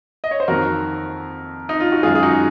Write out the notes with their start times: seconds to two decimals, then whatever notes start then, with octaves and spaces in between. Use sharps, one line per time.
0.24 D#5
0.31 C#5
0.40 C5
0.48 F2 D#3 A#3 F#4 A#4
1.69 D#4
1.80 F4
1.92 F#4
2.03 F#2 D#3 G#3 F4 G#4
2.15 G#4
2.23 D#4 F#4